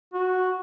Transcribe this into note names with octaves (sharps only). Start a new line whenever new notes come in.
F#4